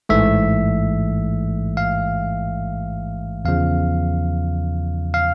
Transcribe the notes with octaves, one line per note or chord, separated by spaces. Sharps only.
A1 G#2 E3 A3 E5
F5
E2 C#3 F3 F5
F5